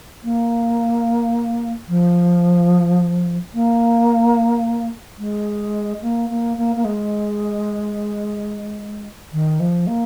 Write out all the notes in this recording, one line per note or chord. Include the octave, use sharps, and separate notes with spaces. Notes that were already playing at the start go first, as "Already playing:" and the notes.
A#3
F3
A#3
G#3
A#3
A#3
A#3
A#3
G#3
D#3
F3
A#3